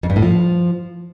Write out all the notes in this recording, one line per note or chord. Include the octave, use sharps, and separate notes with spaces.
F2
G2
A2
F3